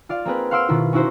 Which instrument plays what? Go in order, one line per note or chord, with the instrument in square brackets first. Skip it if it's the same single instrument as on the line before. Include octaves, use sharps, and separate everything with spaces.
[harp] F4 D5 F5
A#3 C4 G#4 B4
F5 F#5 C6 E6 F6 D7
B2 D#3 E4 F4
C#4 D#4 E4 F#4 C5